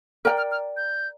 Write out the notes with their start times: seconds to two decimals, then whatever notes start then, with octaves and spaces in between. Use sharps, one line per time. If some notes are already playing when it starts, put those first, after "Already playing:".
0.25 A#4 D5 G5 F6
0.37 F6
0.51 F6
0.77 G6